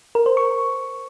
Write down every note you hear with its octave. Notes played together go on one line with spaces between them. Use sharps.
A#4
C5
C#6